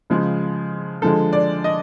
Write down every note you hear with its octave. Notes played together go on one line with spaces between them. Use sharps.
C#3 F3 G#3
D3 F3 G#3 A4
D5
D#5